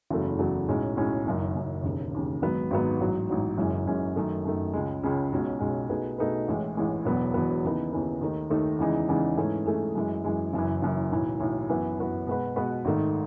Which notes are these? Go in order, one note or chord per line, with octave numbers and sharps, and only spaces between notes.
F#1 E2 C#3 F#3 A3
F#1 E2 C#3 F#3 A3
B1 A2 G#3 C#4
B1 A2 G#3 C#4
F#1 F#2 D#3
F#1 F#2 D#3
E1 D#2 C#3
E1 D#2 C#3
G#1 G#2 F#3 B3
G#1 G#2 F#3 B3
A1 G#2 F#3
A1 G#2 F#3
F#1 F#2 E3 G#3 C#4
F#1 F#2 E3 G#3 C#4
F#2 D#3 A3
F#2 D#3 A3
C#2 C#3 G#3
C#2 C#3 G#3
B1 B2 G#3 C#4
B1 B2 G#3 C#4
B2 A3 D#4 G#4 B4
B2 A3 D#4 G#4 B4
A1 A2 E3 G#3
A1 A2 E3 G#3
E1 E2 B2 F#3 B3
E1 E2 B2 F#3 B3
D#2 C#3 E3 B3 D#4
D#2 C#3 E3 B3 D#4
D#2 D#3 A3 D#4
D#2 D#3 A3 D#4
E2 C#3 E3 G#3 D#4
E2 C#3 E3 G#3 D#4
G#2 E3 A3 C#4 G#4
G#2 E3 A3 C#4 G#4
F#2 E3 G#3
F#2 E3 G#3
F#1 F#2 E3
F#1 F#2 E3
B1 A2 E3
B1 A2 E3
F#2 E3 B3 F#4 B4
F#2 E3 B3 F#4 B4
B2 G#3 B3 F#4 B4
B2 G#3 B3 F#4 B4
G#1 G#2 D#3 A3